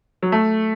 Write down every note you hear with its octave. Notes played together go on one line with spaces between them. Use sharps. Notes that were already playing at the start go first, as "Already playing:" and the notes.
F#3
A3